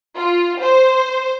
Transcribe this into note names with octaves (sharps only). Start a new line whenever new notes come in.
F4
C5